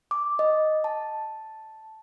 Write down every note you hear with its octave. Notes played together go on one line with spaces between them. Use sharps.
D6
D#5
A5